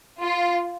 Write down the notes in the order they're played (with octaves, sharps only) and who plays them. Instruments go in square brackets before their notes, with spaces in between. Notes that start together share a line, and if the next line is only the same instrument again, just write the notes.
[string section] F4